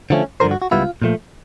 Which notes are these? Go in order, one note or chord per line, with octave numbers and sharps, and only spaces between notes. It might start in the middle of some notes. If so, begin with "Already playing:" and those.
D3 F3 A3 C#4
G2 D3 F3 A#4 C5
F#4
F#4
C#2 B2 G3 B3 E4 F4
A#2 F3 A3